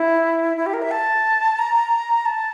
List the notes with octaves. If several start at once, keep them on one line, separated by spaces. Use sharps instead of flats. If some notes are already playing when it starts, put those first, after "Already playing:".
Already playing: E4
E4
G4
A#4
E5
A5
A#5
A5